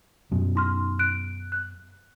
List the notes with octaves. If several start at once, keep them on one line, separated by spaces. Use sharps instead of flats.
F#2 B2
D#4 C6 F6
F#6 D7
F#6